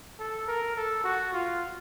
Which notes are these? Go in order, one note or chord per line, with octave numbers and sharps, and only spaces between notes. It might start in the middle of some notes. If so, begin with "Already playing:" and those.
A4
A#4
A4
F#4
F4